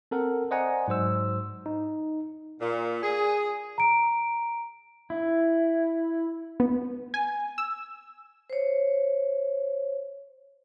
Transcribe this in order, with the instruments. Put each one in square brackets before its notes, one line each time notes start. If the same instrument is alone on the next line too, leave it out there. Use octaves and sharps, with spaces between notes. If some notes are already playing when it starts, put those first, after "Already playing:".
[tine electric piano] C4 A4 A#4 F#5
C5 D5 D#5 F#5 G#5 A#5
G#2 F#3 C5 E6
D#4
[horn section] A#2
G#4
[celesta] A#5 D7
[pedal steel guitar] E4
[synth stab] B3
G#5
E6
[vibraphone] C5 C#5